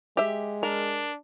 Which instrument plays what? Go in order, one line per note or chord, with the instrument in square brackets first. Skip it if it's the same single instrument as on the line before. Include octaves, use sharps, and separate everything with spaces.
[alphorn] G#3 [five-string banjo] G4 E5
[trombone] D4 [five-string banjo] A#4